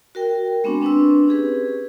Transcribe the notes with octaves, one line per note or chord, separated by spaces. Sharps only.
F#4 A#4 G5
G#3 B3 C4 D4 C#6
C4 D4 B4 C#6 E6
C#4 G4 G#4 B4